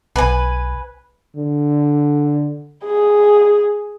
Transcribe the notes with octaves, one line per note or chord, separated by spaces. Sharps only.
B1 B4 G#5
D3
G#4